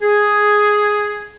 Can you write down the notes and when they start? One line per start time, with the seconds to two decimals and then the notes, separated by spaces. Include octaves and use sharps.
0.02 G#4